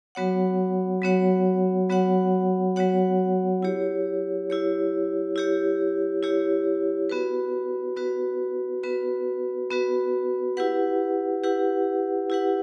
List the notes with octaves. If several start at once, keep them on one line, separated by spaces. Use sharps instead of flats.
F#3 B3 F#4 C#5 F#5
F#3 B3 F#4 C#5 F#5
F#3 B3 F#4 C#5 F#5
F#3 B3 F#4 C#5 F#5
E4 G4 C#5
E4 G4 C#5
E4 G4 C#5
E4 G4 C#5
B3 F#4 B4
B3 F#4 B4
B3 F#4 B4
B3 F#4 B4
E4 G4 B4 F#5
E4 G4 B4 F#5
E4 G4 B4 F#5